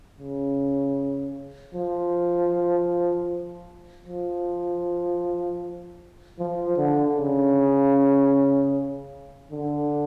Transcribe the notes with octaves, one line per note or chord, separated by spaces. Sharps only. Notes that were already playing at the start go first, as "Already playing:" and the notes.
C#3
F3
F3
F3
D3
C#3
D3